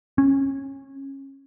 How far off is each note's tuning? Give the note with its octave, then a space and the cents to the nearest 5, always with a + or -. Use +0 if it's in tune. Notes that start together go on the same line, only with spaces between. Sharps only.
C#4 -20